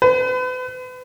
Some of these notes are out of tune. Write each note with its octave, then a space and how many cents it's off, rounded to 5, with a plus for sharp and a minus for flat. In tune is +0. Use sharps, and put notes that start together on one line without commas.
B4 +40